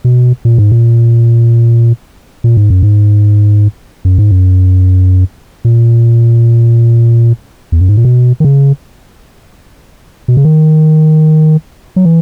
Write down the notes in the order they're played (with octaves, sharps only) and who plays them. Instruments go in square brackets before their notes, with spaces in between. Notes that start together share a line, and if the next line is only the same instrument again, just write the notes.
[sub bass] B2
A#2
G#2
A#2
A#2
G#2
F#2
G#2
F#2
G#2
F#2
A#2
E2
F#2
G#2
A#2
B2
D#3
C#3
B2
C#3
D#3
F#3
E3